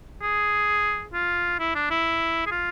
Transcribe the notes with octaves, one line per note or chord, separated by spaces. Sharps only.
G#4
F4
E4
D4
E4
G#4
F4